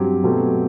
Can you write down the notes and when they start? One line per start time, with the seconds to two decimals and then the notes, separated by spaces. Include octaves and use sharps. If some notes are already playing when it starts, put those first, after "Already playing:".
Already playing: G2 F#3 C4 G4
0.24 B2 F#3 A3 C4